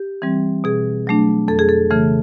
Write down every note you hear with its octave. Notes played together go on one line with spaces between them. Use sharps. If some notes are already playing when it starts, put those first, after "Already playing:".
Already playing: G4
E3 G3 C4
B2 G#4
F#3 A3 D4
F2 A4
G#4
A4
C#3 E3 A3